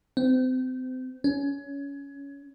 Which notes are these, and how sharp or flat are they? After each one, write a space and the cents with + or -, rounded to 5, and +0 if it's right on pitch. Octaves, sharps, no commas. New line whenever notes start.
C4 -30
C#4 +20